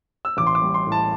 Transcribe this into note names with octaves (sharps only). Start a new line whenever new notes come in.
E6
A1 D6
C6
D6
G3
C6
A2
A5